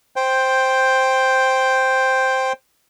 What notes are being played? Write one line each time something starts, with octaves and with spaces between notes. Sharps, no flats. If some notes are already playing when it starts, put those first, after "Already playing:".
C5 G5